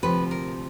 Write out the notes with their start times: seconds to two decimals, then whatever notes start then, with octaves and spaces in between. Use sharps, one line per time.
0.02 D2 C3 F3 B4
0.31 A#4